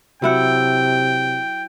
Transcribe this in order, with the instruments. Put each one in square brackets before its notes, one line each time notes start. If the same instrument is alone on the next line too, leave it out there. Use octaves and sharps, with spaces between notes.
[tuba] C3 [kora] F#3 E4 F#5 [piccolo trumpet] G5